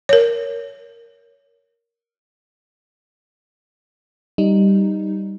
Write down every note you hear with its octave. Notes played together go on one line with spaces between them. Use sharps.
A#4 C#5
G3 D#4